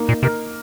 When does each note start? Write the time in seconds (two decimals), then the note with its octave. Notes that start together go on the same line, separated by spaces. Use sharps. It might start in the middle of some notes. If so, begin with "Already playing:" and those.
Already playing: A#3 D#4
0.09 A#2
0.23 C3 A#4